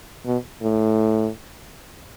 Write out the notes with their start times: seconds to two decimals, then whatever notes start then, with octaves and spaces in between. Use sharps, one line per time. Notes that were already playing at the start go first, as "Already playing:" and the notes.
0.25 B2
0.62 A2